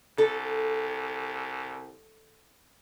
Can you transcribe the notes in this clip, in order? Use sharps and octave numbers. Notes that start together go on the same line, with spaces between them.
C2 A4